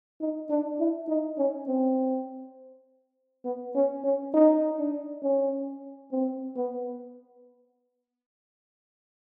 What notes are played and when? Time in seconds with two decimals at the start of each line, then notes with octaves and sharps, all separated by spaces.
0.21 D#4
0.50 D4
0.80 E4
1.09 D#4
1.38 C#4
1.68 C4
3.45 B3
3.75 C#4
4.04 C#4
4.34 D#4
4.79 D4
5.23 C#4
6.12 C4
6.56 B3